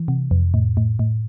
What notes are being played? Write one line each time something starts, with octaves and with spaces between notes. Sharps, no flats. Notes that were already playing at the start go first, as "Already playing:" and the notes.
Already playing: E3
C3
F2
A2
A2
A2